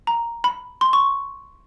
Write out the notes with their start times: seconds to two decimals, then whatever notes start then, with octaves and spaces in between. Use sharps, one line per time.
0.07 A#5
0.44 B5
0.81 C6
0.93 C#6